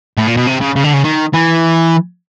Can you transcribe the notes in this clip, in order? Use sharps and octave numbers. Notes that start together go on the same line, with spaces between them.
A2
A#2
B2
C3
C#3
C#3
D3
C#3
D#3
E3